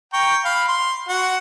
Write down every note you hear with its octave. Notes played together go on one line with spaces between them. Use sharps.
G5 A#5 C#6
F5 B5
C6
F#4 F#5